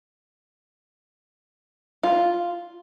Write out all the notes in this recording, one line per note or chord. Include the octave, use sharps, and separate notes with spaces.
F4